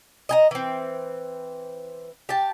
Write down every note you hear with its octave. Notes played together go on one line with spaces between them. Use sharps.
D#5 G#5 A#5
E3 C4
G4 A5